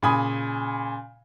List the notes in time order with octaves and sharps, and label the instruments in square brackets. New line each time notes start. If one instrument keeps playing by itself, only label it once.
[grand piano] A#2 C#3 G#5 B5 D#6